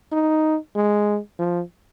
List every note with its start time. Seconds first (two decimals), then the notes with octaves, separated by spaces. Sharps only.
0.12 D#4
0.75 G#3
1.39 F3